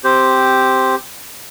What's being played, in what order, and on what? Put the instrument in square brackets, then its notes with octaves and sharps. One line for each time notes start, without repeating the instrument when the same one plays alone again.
[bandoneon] C4 G4 C5